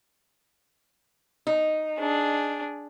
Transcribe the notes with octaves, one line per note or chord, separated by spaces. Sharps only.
D#4
D4 G#4